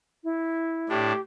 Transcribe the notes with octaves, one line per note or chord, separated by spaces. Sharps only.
E4
A2 D4 G4